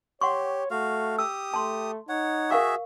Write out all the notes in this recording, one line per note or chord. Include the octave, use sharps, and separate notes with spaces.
G4 C#5 F#5 C6 C#6
A3 F#4 F5
G4 D#6 E6
A3 A5 C6
D#4 C#5 F#5
F#4 G#4 A#4 E5 F5 C#6